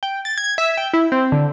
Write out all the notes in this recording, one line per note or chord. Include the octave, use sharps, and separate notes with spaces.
G5
A6
G#6
E5
G5
E4
C4
D3